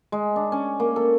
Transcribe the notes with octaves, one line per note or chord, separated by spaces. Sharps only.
G#3
D4
C#4
A#3
A4